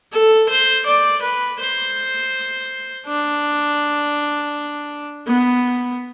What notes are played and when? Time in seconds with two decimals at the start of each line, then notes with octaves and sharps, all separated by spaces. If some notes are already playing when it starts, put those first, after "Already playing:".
0.12 A4
0.49 C5
0.86 D5
1.22 B4
1.59 C5
3.06 D4
5.27 B3